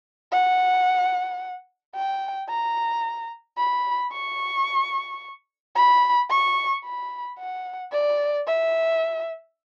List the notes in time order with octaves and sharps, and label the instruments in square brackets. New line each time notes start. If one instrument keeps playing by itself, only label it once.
[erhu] F#5
G5
A#5
B5
C#6
B5
C#6
B5
F#5
D5
E5